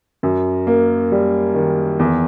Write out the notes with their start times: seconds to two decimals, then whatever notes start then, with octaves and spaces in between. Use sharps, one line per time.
0.23 F#2
0.67 A#3
1.12 G3
1.55 D#3
1.99 E2